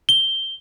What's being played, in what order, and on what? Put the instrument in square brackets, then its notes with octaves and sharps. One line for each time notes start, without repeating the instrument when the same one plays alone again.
[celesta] G7